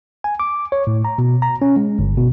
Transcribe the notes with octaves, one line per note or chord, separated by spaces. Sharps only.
G#5
D6
C#5
A2
A#5
B2
A#5
C#4
G#3
G1
B2